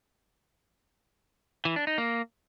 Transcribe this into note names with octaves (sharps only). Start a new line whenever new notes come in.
E3
D4
D#4
A#3